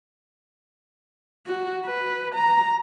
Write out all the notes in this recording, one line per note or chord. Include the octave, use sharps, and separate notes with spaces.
F#4
B4
A#5